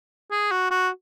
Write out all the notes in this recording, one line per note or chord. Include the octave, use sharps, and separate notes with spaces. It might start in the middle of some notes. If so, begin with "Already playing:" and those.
G#4
F#4
F#4